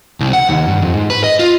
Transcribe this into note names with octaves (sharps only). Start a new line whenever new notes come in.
C2
F#5
D#2
G2
F2
G#2
B4
D#5
F4